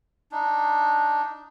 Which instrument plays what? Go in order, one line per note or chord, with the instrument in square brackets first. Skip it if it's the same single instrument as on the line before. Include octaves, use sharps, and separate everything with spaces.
[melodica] D4 D#4